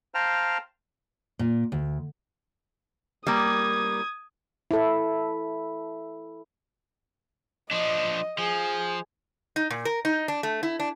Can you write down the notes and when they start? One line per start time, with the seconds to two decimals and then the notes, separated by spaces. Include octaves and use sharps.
0.14 C5 F5 G5 A5 A#5 F6
1.39 A#2
1.72 D2
3.27 G3 A#3 D#6 G#6
4.71 E4 A4
7.71 F3 D4 D#5
8.38 F3 G#4
9.56 D#4
9.70 A#2
9.85 A#4
10.05 D#4
10.28 D4
10.43 A3
10.63 E4
10.80 D4